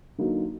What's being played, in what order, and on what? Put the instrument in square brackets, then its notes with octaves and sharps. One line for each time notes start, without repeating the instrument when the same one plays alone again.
[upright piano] D3 F#3 A#3 D#4